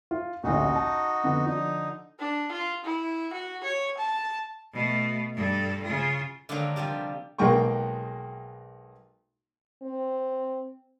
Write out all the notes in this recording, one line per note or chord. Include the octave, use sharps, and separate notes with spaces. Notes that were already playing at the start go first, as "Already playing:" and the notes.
F4
A1 D2 A#2 D#4 F#4
A5
F2 D3 B3
D3 F3 D#4
D4
F4
E4
F#4
C#5
A5
B2 A3
G2 A4
C#3 F4
D3 D#3 F#3 G#3 A#3 D4
C3 F3 G3 G4
B1 G#3 A#3 G5 C#6
C4